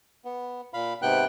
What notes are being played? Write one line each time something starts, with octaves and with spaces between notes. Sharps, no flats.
B3
A#2 F5 B5
G#2 C3 B3 G5 F#6